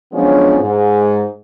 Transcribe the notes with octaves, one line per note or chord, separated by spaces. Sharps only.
F3 F#3 G#3 B3 C#4 D4
G#2